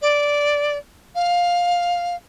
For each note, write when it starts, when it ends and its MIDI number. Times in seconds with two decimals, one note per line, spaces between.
0.02 0.77 74
1.15 2.16 77